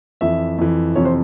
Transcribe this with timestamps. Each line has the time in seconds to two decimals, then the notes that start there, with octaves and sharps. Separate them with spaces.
0.21 F2 E3 E5
0.58 F2 E3
0.95 F2 C3 E3 C#5
1.05 C5